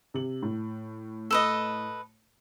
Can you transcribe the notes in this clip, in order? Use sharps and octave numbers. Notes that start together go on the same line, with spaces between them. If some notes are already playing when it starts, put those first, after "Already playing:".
C3 F#7
A2
A4 B4 D#5